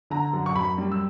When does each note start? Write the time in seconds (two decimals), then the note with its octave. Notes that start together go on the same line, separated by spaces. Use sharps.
0.10 D3 A#5
0.33 F#2
0.46 C#6
0.55 F#2 B5
0.78 G3
0.92 E6